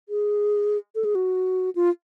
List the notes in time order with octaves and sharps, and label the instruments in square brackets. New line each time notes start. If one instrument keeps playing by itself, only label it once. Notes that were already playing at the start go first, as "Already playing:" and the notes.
[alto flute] G#4
A4
G#4
F#4
F4